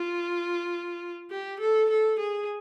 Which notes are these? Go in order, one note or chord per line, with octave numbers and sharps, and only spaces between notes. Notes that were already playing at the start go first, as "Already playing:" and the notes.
Already playing: F4
G4
A4
A4
G#4